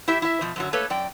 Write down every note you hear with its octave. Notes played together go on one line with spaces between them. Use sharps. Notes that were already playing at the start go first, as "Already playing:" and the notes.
E4 G4 E5
E4 E5
B2 F3
F#2 D3 F#3
A3 A#3 A4 B4 C#5
F#2 D5 G5